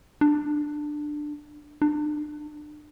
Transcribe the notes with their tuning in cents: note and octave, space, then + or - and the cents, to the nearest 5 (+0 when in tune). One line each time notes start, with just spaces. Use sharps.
D4 +15
D4 +30